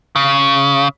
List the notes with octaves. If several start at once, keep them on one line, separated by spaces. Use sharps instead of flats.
C#3